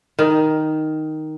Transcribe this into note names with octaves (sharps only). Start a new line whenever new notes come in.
D#3